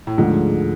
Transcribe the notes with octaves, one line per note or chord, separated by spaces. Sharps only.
A2
D2 G#2 D3 F3 G#3